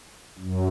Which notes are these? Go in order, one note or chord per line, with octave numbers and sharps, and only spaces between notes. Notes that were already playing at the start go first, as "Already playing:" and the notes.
F#2